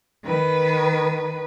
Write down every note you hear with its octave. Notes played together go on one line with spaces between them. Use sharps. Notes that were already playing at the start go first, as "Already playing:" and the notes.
D#3 B4